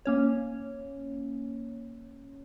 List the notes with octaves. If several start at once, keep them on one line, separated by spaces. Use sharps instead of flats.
A#3 C#4 C#5